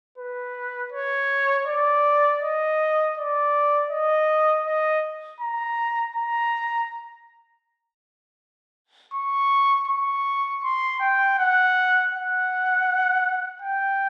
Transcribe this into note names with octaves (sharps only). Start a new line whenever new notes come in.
B4
C#5
D5
D#5
D5
D#5
D#5
A#5
A#5
C#6
C#6
C6
G5
F#5
F#5
G5